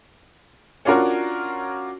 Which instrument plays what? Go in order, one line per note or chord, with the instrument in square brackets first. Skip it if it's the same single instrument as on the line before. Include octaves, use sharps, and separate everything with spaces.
[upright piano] C#4 D4 F4 F#4 A#4 C#5